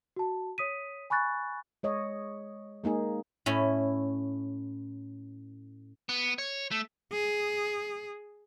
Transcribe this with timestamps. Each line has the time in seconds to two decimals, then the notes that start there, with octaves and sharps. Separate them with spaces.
0.16 F#4 A5
0.58 C#5 D#6 B6 D#7
1.10 G#5 B5 C#6 F#6 A6
1.83 G#3 C#5 D#5
2.84 G#3 A#3 D#4 G#4
3.46 A2 C#4 E4
6.09 B3
6.38 C#5
6.71 A3
7.12 G#4